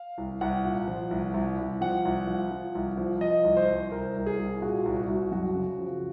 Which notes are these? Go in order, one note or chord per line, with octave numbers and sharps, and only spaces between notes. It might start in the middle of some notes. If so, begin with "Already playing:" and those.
Already playing: F5
C2
C2 F#5
A#2
F3
C2
C2
C2
F3 F#5
C2
F3
F3
C2
F3
F3 D#5
C2
C5
C2
C2 A#4
C2
G#4
C2
A#2 F#4
C2
F#4
C2
F#2 F#4
C#3
F3